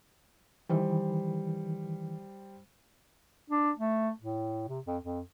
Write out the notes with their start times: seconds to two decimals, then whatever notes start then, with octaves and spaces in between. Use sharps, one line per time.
0.69 D#3 E3 G3 C5
3.50 D4
3.78 A3
4.20 A2
4.68 C3
4.86 F2
5.03 F2